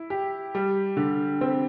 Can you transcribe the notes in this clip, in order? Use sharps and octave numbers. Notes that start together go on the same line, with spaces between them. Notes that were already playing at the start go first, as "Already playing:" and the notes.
Already playing: E4
G4
G3
D3
C4